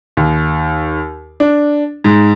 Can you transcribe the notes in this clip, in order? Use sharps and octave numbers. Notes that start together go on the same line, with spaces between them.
D#2
D4
G#2